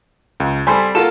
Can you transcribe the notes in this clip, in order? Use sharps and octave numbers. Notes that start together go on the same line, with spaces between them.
C#2
G3 C4 A4 G#5 B5 C6
A#3 F4 F#4 A4 E7